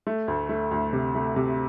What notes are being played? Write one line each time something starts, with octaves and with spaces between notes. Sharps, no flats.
A3
D2
A3
D2
C3
A3
C3